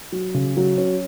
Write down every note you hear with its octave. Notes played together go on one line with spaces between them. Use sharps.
F#3
C#3
F#3
C#4